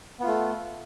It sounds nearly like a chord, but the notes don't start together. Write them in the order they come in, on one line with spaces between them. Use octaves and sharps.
B3 F4 A3